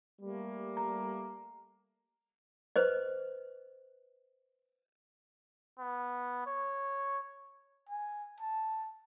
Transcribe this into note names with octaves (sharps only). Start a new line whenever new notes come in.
G3 A3 A#3
A#5
B4 C5 D#5
B3
C#5
G#5
A5